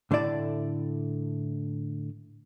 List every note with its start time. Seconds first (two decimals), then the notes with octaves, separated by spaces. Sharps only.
0.11 A2 D3 A3 E4 D5 A5